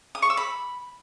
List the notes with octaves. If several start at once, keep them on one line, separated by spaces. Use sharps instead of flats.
D#6
C#6
E6
B5